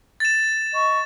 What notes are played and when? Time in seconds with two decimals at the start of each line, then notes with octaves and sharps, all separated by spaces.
0.20 A6 E7
0.74 D#5 C#6